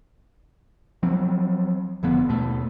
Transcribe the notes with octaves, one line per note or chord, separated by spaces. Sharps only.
F3 F#3 C4
F1 D3 F3 B3
D#2 B2 A3